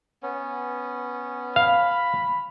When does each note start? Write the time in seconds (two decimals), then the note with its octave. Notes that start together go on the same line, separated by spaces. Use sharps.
0.23 B3 C#4
1.56 F5 B5